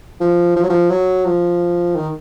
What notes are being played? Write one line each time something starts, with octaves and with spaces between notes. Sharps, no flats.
F3
F3
F#3
F3
F#3
F3
D#3